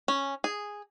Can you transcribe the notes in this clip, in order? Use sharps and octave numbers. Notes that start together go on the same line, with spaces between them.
C#4
G#4